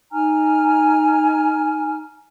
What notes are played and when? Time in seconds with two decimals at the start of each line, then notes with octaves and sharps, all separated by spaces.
0.12 D#4 G#5 A#5 F6